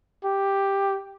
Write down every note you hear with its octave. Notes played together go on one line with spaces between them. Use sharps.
G4